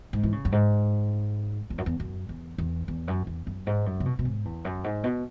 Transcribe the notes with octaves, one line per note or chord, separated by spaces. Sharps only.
G#2
E3
C#3
F#2
G#2
E2
F#2
E2
F#2
E2
E2
E2
F#2
E2
F#2
G#2
F#2
C#3
B2
B2
G#2
E2
F#2
G#2
B2